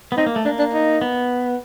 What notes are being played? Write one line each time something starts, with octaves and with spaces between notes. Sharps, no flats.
B3
C4 D#4
A#3
A3
A#3 D4
D4
D#4
B3